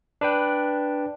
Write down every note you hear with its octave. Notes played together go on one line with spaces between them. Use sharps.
D4 B4 G5